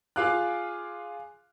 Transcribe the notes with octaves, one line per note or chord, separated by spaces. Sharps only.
F4 G#4 F5 D6 F#6